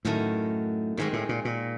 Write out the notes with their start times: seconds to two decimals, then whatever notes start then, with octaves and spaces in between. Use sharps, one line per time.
0.05 F#2 A2 D#3 F#3 A3
0.97 G#2 D#3 G#3 C4
1.13 A2
1.29 A#2
1.45 A#2